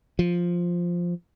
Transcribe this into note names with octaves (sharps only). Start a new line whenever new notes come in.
F3